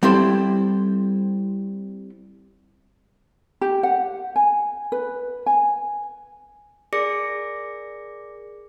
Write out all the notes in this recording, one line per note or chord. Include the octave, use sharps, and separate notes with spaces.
G3 C4 E4 A4 C5
G4
F#5
G#5
B4
G#5
G#4 A#4 D5 D6 A#6 C#7